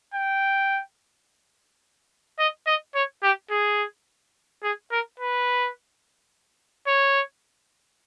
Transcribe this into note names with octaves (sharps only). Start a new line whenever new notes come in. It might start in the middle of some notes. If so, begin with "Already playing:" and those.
G5
D#5
D#5
C#5
G4
G#4
G#4
A#4
B4
C#5